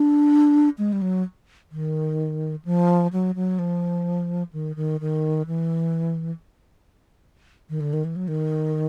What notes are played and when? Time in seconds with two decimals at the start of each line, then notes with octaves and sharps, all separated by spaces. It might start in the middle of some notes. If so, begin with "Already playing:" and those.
Already playing: D4
0.78 G#3
0.93 G3
1.02 F#3
1.71 D#3
2.65 F3
3.13 F#3
3.35 F#3
3.59 F3
4.53 D#3
4.76 D#3
5.01 D#3
5.47 E3
7.70 D#3
7.81 D3
7.93 D#3
8.05 E3
8.16 F#3
8.28 D#3